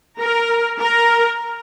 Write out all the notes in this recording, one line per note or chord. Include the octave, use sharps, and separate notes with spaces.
A#4
A#4